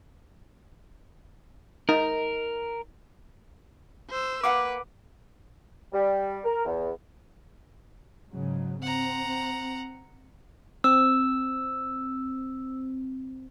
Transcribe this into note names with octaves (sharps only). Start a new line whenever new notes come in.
D#4 A#4
C5 E6
A#3 B4 F5 F#5 D6
G3
A#4
E2
G#2 C#3 F#3
C4 F#5 A#5
C4 E6